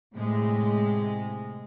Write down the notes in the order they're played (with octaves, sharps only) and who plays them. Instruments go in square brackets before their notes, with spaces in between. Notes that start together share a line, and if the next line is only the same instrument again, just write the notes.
[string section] A2 C3 G#3